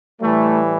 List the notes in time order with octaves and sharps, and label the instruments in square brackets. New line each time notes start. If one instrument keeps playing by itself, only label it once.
[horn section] A2 E3 G3 A3